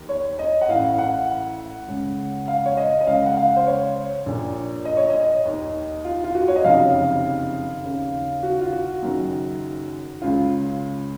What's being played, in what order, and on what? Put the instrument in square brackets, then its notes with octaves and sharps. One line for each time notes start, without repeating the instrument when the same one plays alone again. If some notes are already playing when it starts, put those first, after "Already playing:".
Already playing: [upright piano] D#2 D#3
C#5
D#5
F#5
A1 A2 F5
F#5
C#2 C#3
F5
C#5
D#5
D#5
C#2 C#3 F5
F#5
F5
C5
C#5
A#1 A#2
D#5
C#5
D#5
D#2 D#3
F4
F4
F#4
C#5
D#5
F#1 F2 C3 D#3 F5
D#2 C#3
F#4
F4
F#4
F#1 F#2 D#3
C#2 C#3 F4